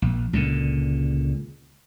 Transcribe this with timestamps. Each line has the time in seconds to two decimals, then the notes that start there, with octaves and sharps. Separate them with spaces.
0.02 A#1
0.33 C#2 A#2 D3